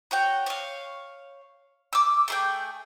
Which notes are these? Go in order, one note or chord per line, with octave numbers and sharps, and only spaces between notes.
F#4 C#5 G5
C#5 F5
D6 E6
A3 G#4 G5